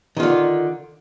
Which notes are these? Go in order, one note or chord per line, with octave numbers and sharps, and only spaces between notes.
D3 D#3 F4